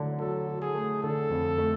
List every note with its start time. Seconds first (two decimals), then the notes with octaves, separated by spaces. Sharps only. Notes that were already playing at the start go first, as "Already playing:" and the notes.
Already playing: D3 F#3 A3
0.20 F#3 A4
0.47 F#3
0.62 G#4
0.75 A3
1.03 D3 A4
1.30 F2
1.58 A3